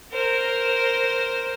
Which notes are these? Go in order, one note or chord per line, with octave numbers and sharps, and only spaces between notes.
A#4 C5